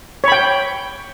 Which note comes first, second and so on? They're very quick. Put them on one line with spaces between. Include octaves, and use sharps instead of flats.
C#5 B5 G5